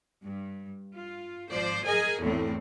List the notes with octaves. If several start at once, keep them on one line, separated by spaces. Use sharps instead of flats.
G2
F4
G#1 F3 C5 D5
G#4 A#4 D#5 G#5
G#1 E2 A2 A3 C4